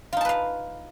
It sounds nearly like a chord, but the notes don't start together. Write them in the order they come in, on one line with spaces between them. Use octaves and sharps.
F4 D#4 A5 B4 F5